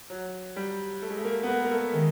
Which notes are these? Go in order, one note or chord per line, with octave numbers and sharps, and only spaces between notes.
F#3
G3
A3
G#3
A3
A#3
B3
A#3
A#3
A3
D#3 G#3